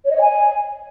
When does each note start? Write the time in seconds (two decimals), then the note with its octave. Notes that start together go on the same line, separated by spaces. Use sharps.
0.05 C#5
0.11 D#5
0.16 C#5
0.21 G#5